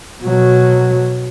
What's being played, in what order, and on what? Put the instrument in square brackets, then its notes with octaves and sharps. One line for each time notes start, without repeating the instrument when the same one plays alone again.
[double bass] B2 F#3